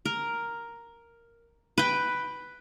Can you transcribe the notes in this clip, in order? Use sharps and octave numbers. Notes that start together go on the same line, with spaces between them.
A#4
B4 G5